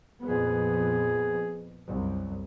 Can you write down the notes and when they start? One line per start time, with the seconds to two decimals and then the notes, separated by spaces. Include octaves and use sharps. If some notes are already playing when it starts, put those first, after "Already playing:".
0.22 F2 A#2 B3 G#4
1.89 C2 F#2